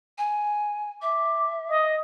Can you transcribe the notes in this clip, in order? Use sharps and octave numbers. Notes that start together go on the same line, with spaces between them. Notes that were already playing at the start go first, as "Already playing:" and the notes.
G#5
E5 D6
D#5 D#6